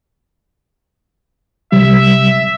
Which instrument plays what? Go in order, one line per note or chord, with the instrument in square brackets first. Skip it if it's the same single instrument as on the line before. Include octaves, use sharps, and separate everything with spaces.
[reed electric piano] C3 G3 [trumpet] E5